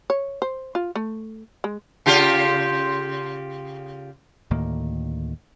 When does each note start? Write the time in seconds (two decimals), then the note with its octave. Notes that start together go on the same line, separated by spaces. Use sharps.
0.10 C#5
0.42 C5
0.75 F4
0.95 A3
1.64 G#3
2.06 C#3 F4 G4
4.51 D2 A2 D#3 A#3